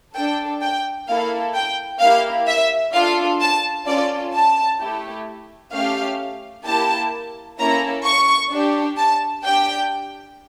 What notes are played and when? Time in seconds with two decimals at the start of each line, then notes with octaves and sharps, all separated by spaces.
0.15 D4 A4 G5
0.62 G5
1.08 A#3 E4 A4 F5
1.54 G5
2.00 A#3 E4 G4 F5
2.47 E5
2.93 D4 F4 A4 F5
3.41 A5
3.87 C#4 F4 A4 D5
4.34 A5
4.79 A3 E4 G4
5.73 A3 C#4 G4 F5
6.65 A#3 E4 G4 A5
7.59 A#3 C#4 E4 A4 A#5
8.05 C#6
8.51 D4 G4
8.97 A5
9.44 D4 G4 G5